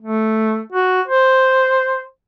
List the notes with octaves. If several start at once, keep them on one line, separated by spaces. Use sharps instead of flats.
A3
F#4
C5